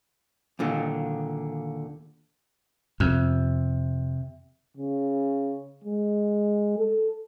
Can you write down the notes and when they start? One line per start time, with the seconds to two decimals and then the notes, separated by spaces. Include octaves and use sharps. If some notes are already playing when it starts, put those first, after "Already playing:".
0.59 D#2 A#2 D3
3.00 F2 C3
4.77 C#3
5.84 G#3
6.78 A4